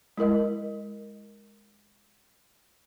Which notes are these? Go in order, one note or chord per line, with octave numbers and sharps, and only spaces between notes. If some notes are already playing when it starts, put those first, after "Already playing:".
G#3 E4 A#4 D#5